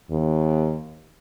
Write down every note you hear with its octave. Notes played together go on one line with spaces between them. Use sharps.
D#2